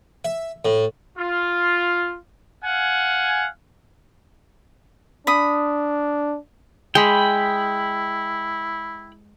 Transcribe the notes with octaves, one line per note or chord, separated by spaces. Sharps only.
E5
A2
F4
F5 F#5 G#5
D4 B5 D#6
G#3 E4 G5 B5